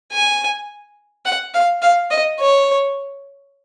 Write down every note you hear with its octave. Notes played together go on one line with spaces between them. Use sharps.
G#5
F#5
F5
F5
D#5
C#5